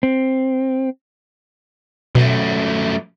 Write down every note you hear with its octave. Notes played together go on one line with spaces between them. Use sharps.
C4
F#2 B2 A3